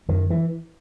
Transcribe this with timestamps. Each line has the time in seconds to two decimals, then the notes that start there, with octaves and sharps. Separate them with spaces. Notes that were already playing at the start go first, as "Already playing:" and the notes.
0.08 F#2 D#3
0.30 E3